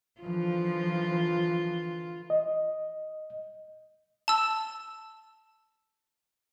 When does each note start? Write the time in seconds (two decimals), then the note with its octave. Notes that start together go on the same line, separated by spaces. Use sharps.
0.21 D3 E3 F3 F4
2.30 D#5
4.28 A5 E6